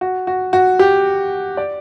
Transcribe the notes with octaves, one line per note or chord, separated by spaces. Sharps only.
F#4
F#4
F#4
G4
D5